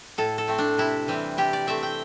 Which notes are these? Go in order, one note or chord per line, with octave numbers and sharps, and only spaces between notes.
A2 A4
A4
A3 C4
D4
C3 E4
E3 G3 C4
C3 G4
D5
A3 C4 E5
G5